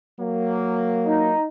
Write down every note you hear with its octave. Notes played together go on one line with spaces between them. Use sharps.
F#3 A#3
D#4